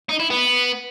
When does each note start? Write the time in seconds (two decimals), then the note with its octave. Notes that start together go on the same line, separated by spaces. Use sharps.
0.09 D#4
0.20 E4
0.30 B3